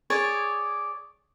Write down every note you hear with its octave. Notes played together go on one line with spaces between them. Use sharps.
G#4 C#5 D5